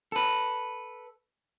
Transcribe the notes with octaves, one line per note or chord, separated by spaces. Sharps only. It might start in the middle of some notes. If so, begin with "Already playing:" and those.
A4 B4